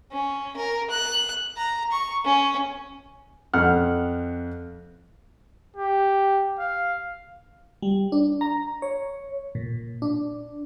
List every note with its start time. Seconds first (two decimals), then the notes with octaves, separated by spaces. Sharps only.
0.12 C#4
0.57 A#4
0.90 F#6
1.57 A#5
1.92 C#6
2.25 C#4
3.54 F2 F#5 F6
5.76 G4
6.59 F5
7.82 G3
8.12 D4
8.41 A#5
8.82 C#5
9.55 A#2
10.02 D4